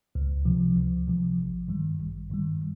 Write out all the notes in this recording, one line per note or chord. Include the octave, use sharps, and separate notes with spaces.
C#2
C3 F3
C#2
C3 F3
A1
G2 D#3 G3
A1
G2 D#3 G3